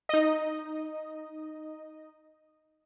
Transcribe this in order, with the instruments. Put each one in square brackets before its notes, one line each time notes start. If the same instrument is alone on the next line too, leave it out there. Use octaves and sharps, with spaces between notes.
[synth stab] D#4 D#5